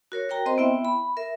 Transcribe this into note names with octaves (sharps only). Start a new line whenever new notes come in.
F#4 A#4 C#5
F#4 A#4 G5 A#5
C4 C5 D#5 C6
B3 E4 E5 G5
B5
A#4 E5